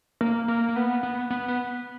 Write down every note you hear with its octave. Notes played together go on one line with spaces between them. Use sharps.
A#3
A#3
A#3
B3
B3
B3
B3